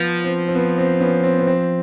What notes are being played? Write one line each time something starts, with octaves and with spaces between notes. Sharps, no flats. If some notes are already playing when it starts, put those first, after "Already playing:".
Already playing: F3 B3
C4
C4
B3
C4
B3 C#4
C4
B3
C4